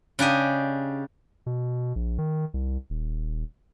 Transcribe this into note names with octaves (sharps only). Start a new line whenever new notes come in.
C#3 D4 G4 D#5
B2
A#1
D#3
C2
D#1